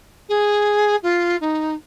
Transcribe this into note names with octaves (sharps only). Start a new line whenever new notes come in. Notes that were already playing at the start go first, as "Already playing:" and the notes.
G#4
F4
D#4